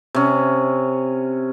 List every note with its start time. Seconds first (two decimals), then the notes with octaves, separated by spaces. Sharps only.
0.15 C3 C#4